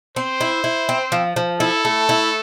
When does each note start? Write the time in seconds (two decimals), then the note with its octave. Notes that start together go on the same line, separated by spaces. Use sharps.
0.16 C4 C5
0.41 E4
0.64 E4
0.89 C4
1.12 F3
1.36 F3
1.60 E4 A4
1.85 A3
2.09 E4